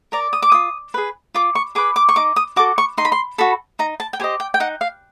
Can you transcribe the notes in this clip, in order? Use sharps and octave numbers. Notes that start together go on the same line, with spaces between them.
A#4 D5 A#5
D#6
D6
F4 D#6
G#4 B4
F4 D6
C#6
G#4 B4 D6
D6
C#6
D#4 D6
D#6
F#4 A4 D6
C#6
D#4 C6
B5
C6
F#4 A4 B5
D#4 A#5
A5
G5
G4 C5 D#5 G#5
G5
G5
D#4 F#5
F5